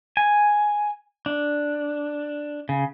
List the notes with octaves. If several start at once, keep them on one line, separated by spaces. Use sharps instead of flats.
G#5
D4
C#3